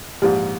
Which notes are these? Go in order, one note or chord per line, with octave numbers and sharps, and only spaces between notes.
A#1 G#2 F3 G4